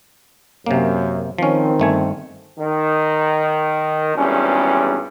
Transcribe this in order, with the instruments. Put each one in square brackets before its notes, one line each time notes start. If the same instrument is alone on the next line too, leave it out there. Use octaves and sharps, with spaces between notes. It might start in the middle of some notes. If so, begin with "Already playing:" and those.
[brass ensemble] F#2 [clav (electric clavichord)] C3 A#3
[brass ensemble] D#3 C4 [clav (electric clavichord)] F3 C#4
[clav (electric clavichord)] G1 A3 G#5
[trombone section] D#3
G#1 E2 G2 G3 C#4